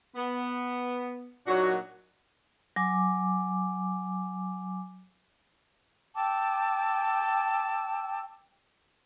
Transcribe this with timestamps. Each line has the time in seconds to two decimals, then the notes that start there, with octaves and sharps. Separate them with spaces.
0.15 B3
1.47 A#2 F#3 D4 D#4 F#4
2.76 F#3 G#5 D6
6.16 G5 A5 D6 E6